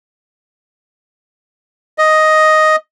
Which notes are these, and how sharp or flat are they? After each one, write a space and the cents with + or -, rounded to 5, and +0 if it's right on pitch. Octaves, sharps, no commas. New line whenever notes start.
D#5 +5